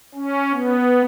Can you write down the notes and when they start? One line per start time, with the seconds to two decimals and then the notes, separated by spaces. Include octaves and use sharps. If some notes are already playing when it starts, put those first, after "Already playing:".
0.15 C#4
0.53 B3